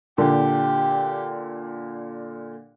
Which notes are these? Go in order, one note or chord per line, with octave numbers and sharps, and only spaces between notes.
A#2 D3 G4